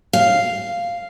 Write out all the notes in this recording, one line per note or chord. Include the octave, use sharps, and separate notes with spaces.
F5